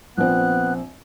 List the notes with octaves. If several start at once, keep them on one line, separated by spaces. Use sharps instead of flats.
A#1 B3 C4 F#6